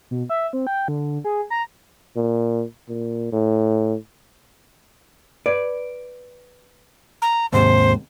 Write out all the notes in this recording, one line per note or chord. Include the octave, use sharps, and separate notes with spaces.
B2
E5
C4
G5
D3
G#4
A#5
A#2
A#2
A2
B4 D5
A#5
D#2 G#2 C3 C5